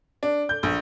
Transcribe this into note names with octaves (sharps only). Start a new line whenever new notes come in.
D4
G6
A#1